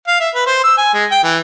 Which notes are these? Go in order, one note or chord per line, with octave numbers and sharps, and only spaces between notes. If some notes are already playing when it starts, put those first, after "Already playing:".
F5
E5
B4
C5
E6
G#5
G#3
G5
E3